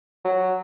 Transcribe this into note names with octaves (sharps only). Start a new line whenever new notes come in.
F#3